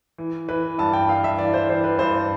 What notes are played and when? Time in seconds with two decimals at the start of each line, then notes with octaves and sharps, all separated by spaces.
0.18 E3
0.49 E3 B4
0.78 G2 A5
0.93 G5
1.08 G2 F5
1.24 E5
1.38 E3 D5
1.54 C5
1.69 E3 C5
1.84 B4
1.99 G2 C5